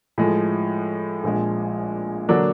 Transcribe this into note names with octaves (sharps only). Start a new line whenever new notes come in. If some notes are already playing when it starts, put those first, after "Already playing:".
A2 F3 G#3
A#1 A#2 F3 G#3
D3 F#3 A#3 D4